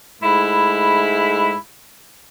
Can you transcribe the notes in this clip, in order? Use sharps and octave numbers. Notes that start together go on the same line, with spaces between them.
G#2 G#3 A3 E4 B5